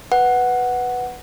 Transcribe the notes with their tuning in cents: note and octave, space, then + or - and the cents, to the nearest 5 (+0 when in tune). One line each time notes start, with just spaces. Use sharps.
B4 +0 F#5 +0